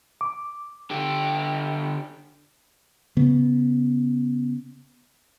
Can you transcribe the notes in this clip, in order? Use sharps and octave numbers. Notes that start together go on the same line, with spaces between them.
D6
D3 G4
C#3 B3